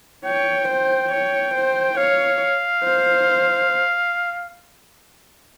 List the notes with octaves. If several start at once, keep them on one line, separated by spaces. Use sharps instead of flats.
C#5 G5
C5
C#5
C5
C#5 F5
C5